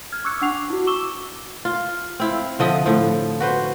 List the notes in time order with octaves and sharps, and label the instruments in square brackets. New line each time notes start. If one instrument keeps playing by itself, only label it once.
[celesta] F6 G#6
C#6 D6 E6 F#6 G#6 C#7
D4 F#5 C#6 D6 C7 F7
E4 F#4
C#6 D6 E6 E7 G7
[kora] F4
C4 E4 F5
D3 F3 D#5 E5
A2 F3
F#4 B4 C5